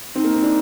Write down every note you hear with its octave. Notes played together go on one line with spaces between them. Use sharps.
C4 D#4
A#3
C4
D4